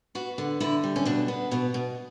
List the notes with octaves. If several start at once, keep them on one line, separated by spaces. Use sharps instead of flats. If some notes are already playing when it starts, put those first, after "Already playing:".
B3 F#4
D3
D3 E4
G3
C#4
B2 D4
B3
B2 B3
B2